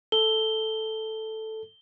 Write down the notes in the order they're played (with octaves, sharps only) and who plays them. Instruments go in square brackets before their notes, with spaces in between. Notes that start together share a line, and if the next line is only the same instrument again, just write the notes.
[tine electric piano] A4 [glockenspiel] G7